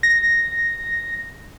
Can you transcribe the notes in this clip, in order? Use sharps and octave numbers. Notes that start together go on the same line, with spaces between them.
A#6